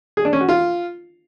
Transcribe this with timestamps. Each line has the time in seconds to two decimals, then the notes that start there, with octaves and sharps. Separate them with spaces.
0.17 G#4
0.25 D4
0.33 C#4
0.41 F#4
0.49 F4